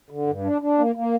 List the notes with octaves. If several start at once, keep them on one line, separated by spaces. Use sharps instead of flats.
D3
G2
D4
D4
A#3
A#3